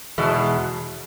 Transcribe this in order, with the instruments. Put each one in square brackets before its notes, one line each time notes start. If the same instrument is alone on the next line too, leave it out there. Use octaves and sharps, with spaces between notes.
[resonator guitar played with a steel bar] E2 B2 G#3